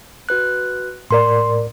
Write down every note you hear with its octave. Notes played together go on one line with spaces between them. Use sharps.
F#4 B4 F#6
A2 A#4 D5 C6